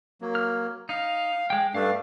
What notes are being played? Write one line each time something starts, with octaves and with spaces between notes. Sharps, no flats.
F#3 A#3
F6
D#4 F5
G#3 G5
G2 A3 D4 F5